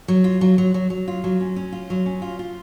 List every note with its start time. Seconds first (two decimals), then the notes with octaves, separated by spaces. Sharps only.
0.08 F#3
0.24 F4
0.41 F#3
0.58 F#3
0.74 F#3
0.90 F#3
1.08 F4
1.24 F#3
1.41 C#4
1.56 C#4
1.72 F4
1.90 F#3
2.06 C#4
2.22 F4
2.39 F4